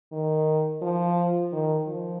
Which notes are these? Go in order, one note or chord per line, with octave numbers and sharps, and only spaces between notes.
D#3
F3
D#3
F3